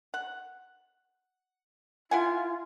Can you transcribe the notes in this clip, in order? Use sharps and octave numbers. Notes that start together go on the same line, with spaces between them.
F#5
E4 F4 F#5 G#5